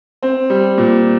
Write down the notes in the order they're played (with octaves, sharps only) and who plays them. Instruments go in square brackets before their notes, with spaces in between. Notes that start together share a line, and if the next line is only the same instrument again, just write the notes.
[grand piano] C4
G3
A#2